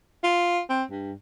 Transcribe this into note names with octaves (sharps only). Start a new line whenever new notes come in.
F4
C4
G2